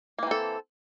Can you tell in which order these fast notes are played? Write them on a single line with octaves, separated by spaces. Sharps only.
A#3 E3 C4 A4